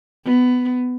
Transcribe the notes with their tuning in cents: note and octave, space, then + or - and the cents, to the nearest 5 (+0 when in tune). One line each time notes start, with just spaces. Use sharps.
B3 +15